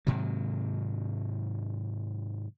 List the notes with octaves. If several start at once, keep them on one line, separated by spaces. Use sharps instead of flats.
G#2 C3 D#3 F#3